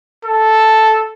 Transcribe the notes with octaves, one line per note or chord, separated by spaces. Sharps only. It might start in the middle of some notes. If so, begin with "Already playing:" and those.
A4